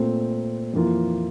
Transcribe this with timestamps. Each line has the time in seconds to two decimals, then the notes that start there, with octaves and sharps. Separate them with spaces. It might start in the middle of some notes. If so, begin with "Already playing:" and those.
Already playing: A#2 A3 C4
0.74 F2 E3 A#3 F4